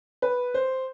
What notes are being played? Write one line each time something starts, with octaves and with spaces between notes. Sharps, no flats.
B4
C5